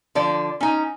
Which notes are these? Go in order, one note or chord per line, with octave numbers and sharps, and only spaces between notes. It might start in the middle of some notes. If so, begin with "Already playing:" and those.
D3 F3 D5
C#4 D#4